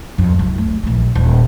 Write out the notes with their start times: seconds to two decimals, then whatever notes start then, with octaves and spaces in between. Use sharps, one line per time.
0.18 F2
0.39 C2 F#2
0.58 A3
0.83 A#1 E3
1.15 D#1